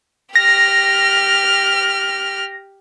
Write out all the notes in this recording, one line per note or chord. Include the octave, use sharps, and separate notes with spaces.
G4 F6 A#6